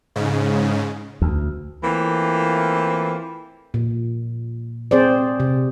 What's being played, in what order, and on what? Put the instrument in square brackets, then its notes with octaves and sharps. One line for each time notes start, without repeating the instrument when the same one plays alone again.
[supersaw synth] G#2 C#3
[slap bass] D2
[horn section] E3 A3 A#3 C4 F4
[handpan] A#2
C4 G#4 C5 D5
C3